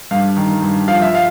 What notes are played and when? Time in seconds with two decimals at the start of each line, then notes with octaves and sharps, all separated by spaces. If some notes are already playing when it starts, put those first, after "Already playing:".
0.11 G2 F5
0.37 D#3
0.62 G2
0.88 F3 F5
1.02 E5
1.15 F5